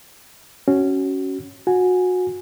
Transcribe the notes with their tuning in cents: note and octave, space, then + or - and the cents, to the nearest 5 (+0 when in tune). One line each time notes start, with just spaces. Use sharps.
C#4 +0 F#4 +20
F#4 -25 G#5 +0